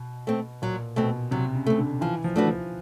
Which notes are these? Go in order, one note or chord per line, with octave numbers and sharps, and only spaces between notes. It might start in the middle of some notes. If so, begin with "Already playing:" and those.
Already playing: B2
A3 C4
A#2 F#3
B2 A3 C4
C3 F#3
C#3
A3 C4
D3
E3 F3
F3
A3 D4 F#4 B4
F3